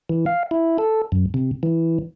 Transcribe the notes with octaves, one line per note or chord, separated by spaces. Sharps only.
E3
F5
E4
A4
F#2
C3
E3